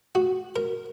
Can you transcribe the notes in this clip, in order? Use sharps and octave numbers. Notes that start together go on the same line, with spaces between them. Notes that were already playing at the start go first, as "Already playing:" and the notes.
F#4
A#4